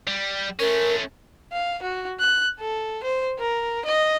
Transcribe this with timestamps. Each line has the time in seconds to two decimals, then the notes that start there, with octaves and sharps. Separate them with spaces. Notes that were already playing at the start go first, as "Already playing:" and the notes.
0.07 G3
0.60 A3 C#4 A#4
1.52 F5
1.82 F#4
2.19 F#6
2.60 A4
3.03 C5
3.39 A#4
3.85 D#5